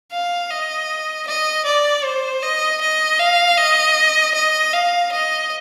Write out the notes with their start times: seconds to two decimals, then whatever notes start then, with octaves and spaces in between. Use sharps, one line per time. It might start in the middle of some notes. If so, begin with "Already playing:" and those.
0.12 F5
0.50 D#5
1.27 D#5
1.65 D5
2.04 C5
2.42 D#5
2.81 D#5
3.20 F5
3.58 D#5
4.34 D#5
4.73 F5
5.12 D#5